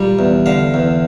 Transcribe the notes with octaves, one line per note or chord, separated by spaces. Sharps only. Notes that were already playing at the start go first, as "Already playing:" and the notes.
Already playing: A#2 G3
E2
D3 F5
E2